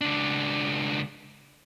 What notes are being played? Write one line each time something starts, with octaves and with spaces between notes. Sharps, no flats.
C#2 D4